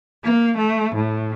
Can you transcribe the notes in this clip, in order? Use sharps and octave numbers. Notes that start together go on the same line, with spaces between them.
A#3
A3
A2